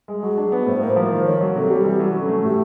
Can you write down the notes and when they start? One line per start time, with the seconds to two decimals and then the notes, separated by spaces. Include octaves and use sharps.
0.08 G#3
0.22 F#3 G#4
0.37 D4
0.52 B3
0.66 A2 C5
0.81 A#3 C5
0.96 F3
1.11 D#3 C5
1.25 A#3 C#5
1.41 F#3
1.55 C3 A4
1.70 G3
1.84 E3
1.99 F#3
2.15 C#4
2.28 A3
2.43 A2 G4